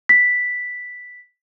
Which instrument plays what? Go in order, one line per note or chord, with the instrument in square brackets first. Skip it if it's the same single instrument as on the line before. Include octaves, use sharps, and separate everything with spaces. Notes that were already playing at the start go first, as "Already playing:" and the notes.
[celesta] B6